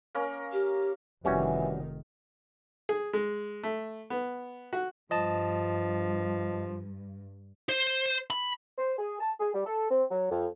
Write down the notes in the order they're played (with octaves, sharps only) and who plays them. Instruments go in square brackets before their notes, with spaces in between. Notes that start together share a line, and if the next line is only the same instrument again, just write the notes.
[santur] A#3 C#4 A#4
[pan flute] G4
[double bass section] F1 D#3 [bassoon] E3 [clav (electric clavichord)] G3 C#4 F#4
[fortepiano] G#4
G#3
A3
B3
F#4
[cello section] G2 [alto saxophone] F3 [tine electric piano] D#5 A5
[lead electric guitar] C5
B5
[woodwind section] C5
G#4
A5
G#4
G3
A4
C4
F#3
F2